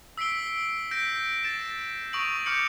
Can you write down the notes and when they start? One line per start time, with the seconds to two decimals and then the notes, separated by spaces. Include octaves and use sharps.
0.18 E6 B6 C7 D7 G7
0.91 G6 A#6 B6 D7
1.44 A6 D7 E7
2.13 C#6 D#6 A#6 D7 F#7
2.46 C#6 D6 F6 G6 C#7 F#7